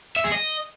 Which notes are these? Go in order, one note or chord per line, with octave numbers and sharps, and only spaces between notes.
E5
G#4
D#5